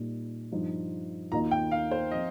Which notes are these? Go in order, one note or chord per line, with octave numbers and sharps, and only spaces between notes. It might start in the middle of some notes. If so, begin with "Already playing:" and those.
Already playing: A#2 G3 A#3 D#4
G2 F3 D#4
D#2 D#3 A#3 F4 D#5 A#5
G5
F5
C5
F3 C4 D#5